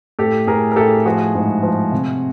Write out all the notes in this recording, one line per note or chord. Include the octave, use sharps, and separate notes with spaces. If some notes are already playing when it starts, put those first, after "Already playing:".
A2 G4 A4
A2 G#4 A#4
A#4
A2 G4 A4
F3 F#4 G#4
G#2
F3
C3